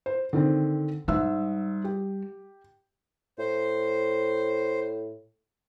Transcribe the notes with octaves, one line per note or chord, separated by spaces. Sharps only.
C5
D3 D#3 C4
G#2 G3 E5 E6
G4
A2 C5